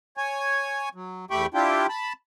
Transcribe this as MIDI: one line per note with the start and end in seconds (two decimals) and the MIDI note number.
0.17 0.89 73
0.17 0.89 80
0.95 1.25 54
1.31 1.46 40
1.31 1.46 57
1.31 1.46 67
1.31 1.46 79
1.31 1.46 83
1.31 1.46 85
1.54 1.87 62
1.54 1.87 64
1.54 1.87 65
1.54 1.87 67
1.54 1.87 79
1.89 2.13 81
1.89 2.13 83